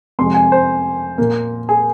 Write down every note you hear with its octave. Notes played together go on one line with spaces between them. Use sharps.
F2 C3 G#3 C6
G#5
C5
A#2 A#3
G#4